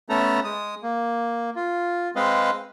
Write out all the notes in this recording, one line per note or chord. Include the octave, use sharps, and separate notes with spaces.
A3 B3 C#4 A4 A#5
G#3 D#6
A#3
F4
G#3 C4 B4 D#5 F5